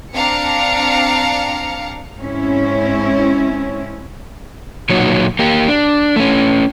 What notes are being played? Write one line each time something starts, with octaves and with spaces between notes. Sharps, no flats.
C4 D4 F5 A#5 C#7
G#2 C4 C#4 E4
A#2 F#3 D#4 F#4 C#5
A#3 G4
D4
A3 C#4